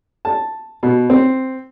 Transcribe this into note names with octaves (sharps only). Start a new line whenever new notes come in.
A5
B2
C4